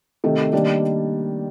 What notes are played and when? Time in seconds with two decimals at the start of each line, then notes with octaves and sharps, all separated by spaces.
0.24 C3 D#3 A3
0.53 D#3 G3 A#3 D4